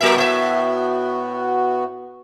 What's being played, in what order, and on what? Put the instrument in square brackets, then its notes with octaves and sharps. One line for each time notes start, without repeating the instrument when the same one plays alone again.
[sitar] F#3 A#4 E5 [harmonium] B3 F#4
[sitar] A2 C5 E5